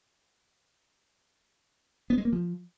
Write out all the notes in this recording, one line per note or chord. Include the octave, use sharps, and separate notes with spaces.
B3
G#3
A#3
F3